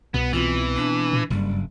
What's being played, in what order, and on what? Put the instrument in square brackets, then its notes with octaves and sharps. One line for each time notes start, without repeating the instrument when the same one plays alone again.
[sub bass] C2 [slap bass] B2 [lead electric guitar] B3
[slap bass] B2 C4 [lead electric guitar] E3 [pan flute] F4
[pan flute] D4
[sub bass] A#2
[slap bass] F#1 [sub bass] G2 [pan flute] G3